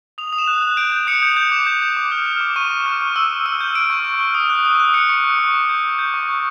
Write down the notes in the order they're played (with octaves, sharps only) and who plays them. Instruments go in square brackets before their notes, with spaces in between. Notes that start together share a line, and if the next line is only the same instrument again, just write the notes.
[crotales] D#6 F7
D#6
E7
F#6
F#6
G6 D7
G6
D#6 C#7
G6
G6
D6
G6
G6
D6
F6
F6
D6
C#6 D#7
C#6
F6
C#6
E6
C#6
E6
G6
F6 D7
C#6
C#6
F6
D#6
F#6
D#6
F#6
F#6 C#7
C#6
F#6
C#6
D6
G6
G6
G6
C#6
C#6